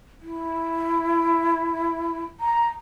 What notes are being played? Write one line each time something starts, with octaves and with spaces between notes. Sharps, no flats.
E4
A#5